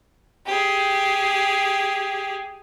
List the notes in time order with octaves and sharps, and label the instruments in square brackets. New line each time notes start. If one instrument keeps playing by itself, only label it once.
[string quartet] G4 G#4